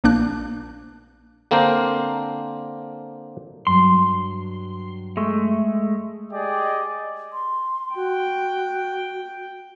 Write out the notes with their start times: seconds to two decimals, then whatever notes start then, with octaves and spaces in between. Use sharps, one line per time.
0.04 A#1 A#3 D4 F#6
1.51 D3 A#3 C4 D4 A#4 C5
3.67 G2 F#3 C6
5.17 G#3 A3
6.32 G4 G#4 D5 D#5 G5
7.33 C6
7.96 F#4 G5